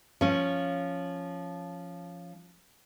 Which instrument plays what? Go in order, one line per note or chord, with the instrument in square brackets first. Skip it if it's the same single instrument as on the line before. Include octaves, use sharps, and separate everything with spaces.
[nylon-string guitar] F3 C#4